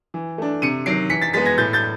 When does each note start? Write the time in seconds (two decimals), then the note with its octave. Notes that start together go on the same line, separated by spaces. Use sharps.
0.14 E3
0.38 A3 D4
0.62 C3 C#7 D#7
0.86 D#3 F#3 C7 D7
1.10 E3 B6 C#7
1.21 A6 B6
1.33 G#3 B3 A6 B6
1.45 G#6 A#6
1.58 A2 G6 A6
1.73 G6 A6